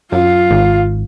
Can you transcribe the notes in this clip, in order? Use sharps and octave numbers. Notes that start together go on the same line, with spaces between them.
F#2 F4 F5
G#1